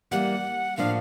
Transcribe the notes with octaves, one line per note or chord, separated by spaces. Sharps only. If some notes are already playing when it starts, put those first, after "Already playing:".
E3 G3 A#3 F#5
A2 F3 A#3 D4 F5